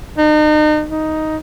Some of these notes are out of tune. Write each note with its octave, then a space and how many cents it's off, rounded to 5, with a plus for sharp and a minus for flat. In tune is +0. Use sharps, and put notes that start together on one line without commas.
D#4 -40
D#4 +5